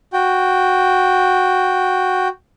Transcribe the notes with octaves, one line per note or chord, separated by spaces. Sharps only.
F#4 G5